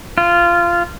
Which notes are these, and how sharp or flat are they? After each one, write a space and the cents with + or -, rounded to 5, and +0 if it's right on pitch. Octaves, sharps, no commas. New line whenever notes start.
F4 -15